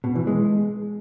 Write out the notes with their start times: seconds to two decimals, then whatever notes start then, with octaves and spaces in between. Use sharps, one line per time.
0.04 B2
0.15 E3
0.27 G#3